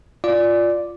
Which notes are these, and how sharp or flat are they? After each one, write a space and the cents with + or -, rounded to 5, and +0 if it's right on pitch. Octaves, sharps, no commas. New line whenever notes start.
F4 +0 D5 +0